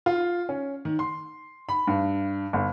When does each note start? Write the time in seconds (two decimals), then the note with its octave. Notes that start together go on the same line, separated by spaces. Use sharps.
0.06 F4
0.49 C#4
0.85 D#3
0.99 C6
1.69 B5
1.87 G2
2.53 G1